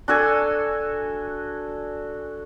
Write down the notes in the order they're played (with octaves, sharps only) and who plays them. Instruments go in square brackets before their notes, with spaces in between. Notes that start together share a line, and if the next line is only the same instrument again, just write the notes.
[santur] D4 F#4 A4 G#5